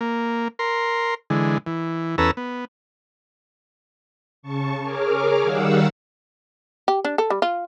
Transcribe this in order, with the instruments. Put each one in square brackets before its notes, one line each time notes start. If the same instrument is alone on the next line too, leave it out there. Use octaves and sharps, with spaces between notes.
[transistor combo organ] A#3
A#4 C6
D3 E3 G#3
E3
E2 C#4 A4 B4 A#5 E6
B3
[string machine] C#3 A5 C#6
G#4 A#4 C#5 D6 F6
D#3 G3 F5 F#5 E6
[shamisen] G4
D4
A4
G3
F4